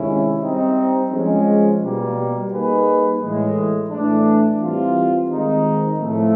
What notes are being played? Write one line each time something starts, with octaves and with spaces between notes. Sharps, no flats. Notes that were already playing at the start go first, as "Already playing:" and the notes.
Already playing: C3 D#3 G#3 C#4 E4
G3 C4 D#4
F3 G#3 C#4
B2 G3 A#3
G3 A#3 D#4 G#4 B4
A2 E3 G#3
A2 E3 A3 D4
E3 G3 C4 F4
D#3 G#3 C4 D#4
A2 F3 A3